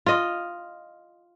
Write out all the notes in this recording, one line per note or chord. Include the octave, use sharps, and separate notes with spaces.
F4 D#5